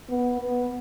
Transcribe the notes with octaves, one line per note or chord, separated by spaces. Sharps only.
B3
B3